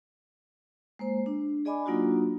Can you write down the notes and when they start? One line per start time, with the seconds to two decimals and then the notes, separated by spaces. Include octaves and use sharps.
0.99 G#3 A#3 C5
1.26 D4
1.65 G#4 D5 D#5 G#5 B5 D6
1.86 F#3 A#3 D4 D#4 F4 F#4